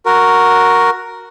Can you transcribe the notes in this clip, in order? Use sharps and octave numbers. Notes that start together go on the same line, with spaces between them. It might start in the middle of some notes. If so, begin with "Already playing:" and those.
F#4 A#4